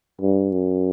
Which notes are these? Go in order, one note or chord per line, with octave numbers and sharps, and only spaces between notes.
G2
F#2